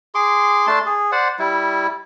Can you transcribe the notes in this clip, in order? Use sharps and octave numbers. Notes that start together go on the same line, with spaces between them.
G#4 C6 D6
A3 D4 A5 C6
G#4
C5 D5 F#5
G3 E4